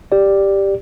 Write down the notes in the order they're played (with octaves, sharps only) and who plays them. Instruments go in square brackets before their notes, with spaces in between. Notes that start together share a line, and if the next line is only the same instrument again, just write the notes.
[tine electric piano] G4 D5